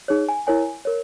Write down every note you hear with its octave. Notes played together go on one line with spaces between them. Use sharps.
D#4 G#4 C#5
G#5
E4 A#4 C#5 G#5
A#4 C#5